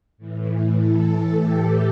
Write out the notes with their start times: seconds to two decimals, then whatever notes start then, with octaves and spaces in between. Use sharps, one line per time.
0.18 A2 E3
0.77 A4
1.35 G4